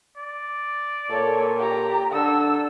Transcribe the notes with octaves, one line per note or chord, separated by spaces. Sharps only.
D5
A#2 A4 C#5
G4 A#5
D3 D4 A4 E6